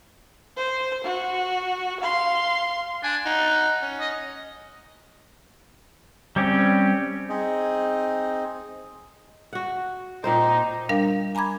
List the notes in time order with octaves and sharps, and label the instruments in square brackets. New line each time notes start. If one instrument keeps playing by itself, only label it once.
[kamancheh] C5
F#4
F5 C6
[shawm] D4 [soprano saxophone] G#5
[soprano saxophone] D#4 [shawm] F#5
[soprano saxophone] C#4
[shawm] D#5
[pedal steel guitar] G3 C4 C#4 G4
[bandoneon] C4 D#4 G#4 D#5
[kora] F#4 F#5
[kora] A#2 C4 C5 [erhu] D#4
[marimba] G3 D4 A#4 F5
G#5 A#5 B5 D6 G#6